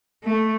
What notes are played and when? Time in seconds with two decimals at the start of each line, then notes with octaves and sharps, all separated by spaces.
0.24 A3